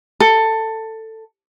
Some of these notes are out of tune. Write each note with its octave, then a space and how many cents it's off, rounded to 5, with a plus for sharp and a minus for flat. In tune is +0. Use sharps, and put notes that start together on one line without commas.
A4 +15